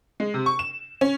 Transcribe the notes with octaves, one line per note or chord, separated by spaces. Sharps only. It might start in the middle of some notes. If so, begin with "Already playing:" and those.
G#3
C3
C#6
E7
C#4